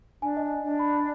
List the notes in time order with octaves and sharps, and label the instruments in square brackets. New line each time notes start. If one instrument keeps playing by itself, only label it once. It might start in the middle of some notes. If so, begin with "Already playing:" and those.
[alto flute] D4 [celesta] G#5
[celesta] D#5
[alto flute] D4
[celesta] B5